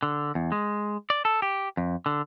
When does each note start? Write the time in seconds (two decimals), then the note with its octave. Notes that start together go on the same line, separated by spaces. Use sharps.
0.03 D3
0.35 E2
0.52 G#3
1.10 D5
1.25 A4
1.42 G4
1.77 F2
2.06 D3